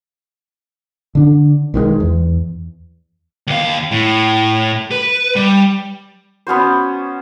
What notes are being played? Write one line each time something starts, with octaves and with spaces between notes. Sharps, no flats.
D3 D4
B1 D#3 E3 G#3
E2
D#2 F5
A2
B4
G3
B3 C#4 F#4 C5